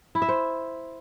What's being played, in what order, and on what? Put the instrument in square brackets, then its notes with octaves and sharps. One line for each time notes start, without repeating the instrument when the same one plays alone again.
[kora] E4
E5
C5